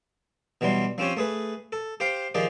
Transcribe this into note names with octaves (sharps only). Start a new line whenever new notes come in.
B2 E3 F#3 G3 C6
F3 C4 C#4 G4 C#5
A3 G#4 B4
A4
G4 C5 F5 G5 C6
D#3 F3 G4 G#4 D5